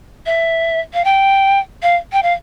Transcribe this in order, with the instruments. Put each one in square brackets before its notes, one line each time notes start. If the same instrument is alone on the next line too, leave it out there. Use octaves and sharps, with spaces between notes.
[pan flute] E5
F5
G5
F5
G5
F5